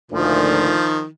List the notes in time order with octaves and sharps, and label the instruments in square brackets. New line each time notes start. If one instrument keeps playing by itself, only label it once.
[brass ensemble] D2 A#2 [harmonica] D#3 F3